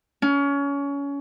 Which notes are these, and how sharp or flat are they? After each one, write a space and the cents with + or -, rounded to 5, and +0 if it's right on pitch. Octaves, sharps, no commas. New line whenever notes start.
C#4 +25